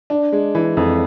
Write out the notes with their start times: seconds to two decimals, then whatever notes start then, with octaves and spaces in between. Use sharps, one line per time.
0.10 D4
0.32 G#3
0.55 E3
0.77 F2